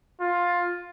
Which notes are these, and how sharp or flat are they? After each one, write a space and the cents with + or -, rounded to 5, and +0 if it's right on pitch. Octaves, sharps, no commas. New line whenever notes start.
F4 +10